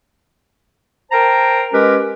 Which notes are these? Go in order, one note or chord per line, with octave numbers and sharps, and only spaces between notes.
A#4 C5 G5 A5 A#5
G#3 C#4 G4 A#4 B4